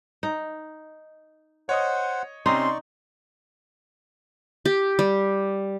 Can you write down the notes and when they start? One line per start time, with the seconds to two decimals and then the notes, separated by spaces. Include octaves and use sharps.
0.23 D#4
1.69 C5 C#5 D#5 F#5 D#6
2.46 C3 C4 C#4 D#4 D5 C6 C#6
4.65 G4
4.99 G3